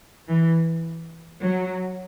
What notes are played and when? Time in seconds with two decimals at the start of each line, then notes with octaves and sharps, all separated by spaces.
0.28 E3
1.42 F#3